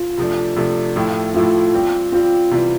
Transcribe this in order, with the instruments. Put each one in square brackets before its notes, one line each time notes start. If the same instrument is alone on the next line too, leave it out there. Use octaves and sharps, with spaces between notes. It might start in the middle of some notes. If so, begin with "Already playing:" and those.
Already playing: [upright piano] F4
[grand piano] C3 F3 A3 D4
C3 F3 A3 D4
A2 F3 A3 E4 G4
[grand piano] A2 F3 A3 E4 G4 [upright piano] F4
[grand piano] G3 C4 G4
[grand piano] G3 C4 G4 [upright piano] F4
[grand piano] C3 E3 G3